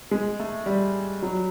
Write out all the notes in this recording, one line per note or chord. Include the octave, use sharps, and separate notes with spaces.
G#3
A3
G3
F#3